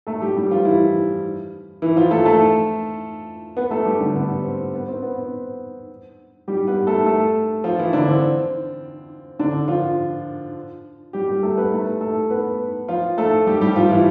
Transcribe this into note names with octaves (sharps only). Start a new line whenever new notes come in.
A3 A4
G3 G4
G3 G4
F3 F4
E3 E4
E3 E4
F3 F4
A3 A4
A3 A4
B3 B4
A3 A4
G3 G4
D3 D4
B3
C4
B3
C4
B3
C4
G3 G4
B3 B4
A3 A4
A3 A4
F3 F4
E3 E4
D3 D4
C4
D3 D4
F3 F4
G3 G4
G3 G4
A3 A4
B3 B4
A3 A4
A3 A4
B3 B4
F3 F4
A3 A4
G3 G4
G3 G4
F3 F4
E3 E4